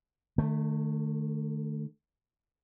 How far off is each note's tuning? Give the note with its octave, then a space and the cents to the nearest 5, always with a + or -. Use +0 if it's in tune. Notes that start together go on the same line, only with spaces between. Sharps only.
D#3 -45 A3 +0